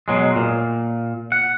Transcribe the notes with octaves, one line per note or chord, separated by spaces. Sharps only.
B2 F#3 G#3
A#2
F#5